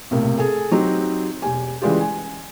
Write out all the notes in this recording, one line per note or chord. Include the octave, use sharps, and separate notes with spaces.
B1 A2 C3 A#3
G#4 A4 G#5
F#3 C4 D#4 G4
E1 G4 G#5
C#3 E3 G3 G#3 F4 G4
G#5